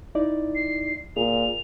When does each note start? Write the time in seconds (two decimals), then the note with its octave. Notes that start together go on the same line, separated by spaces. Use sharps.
0.15 D#4 E4 D5
0.55 C7
1.17 A#2 G#4 F7